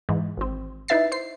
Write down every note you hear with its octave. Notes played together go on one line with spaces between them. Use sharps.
G#2 E3
G#1 C4
D#4 E4 B4 E5 A6 C7
C5 C7